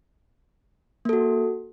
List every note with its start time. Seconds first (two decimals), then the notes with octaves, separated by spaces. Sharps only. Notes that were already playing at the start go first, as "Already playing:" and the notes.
1.05 A#3
1.09 A4
1.13 F#4